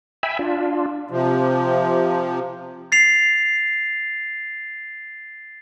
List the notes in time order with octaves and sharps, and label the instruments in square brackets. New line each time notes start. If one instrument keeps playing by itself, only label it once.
[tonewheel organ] E5 G5 G#5 B5 E6
D4 F4
[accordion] C3 F3
[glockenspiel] A6 C7 F7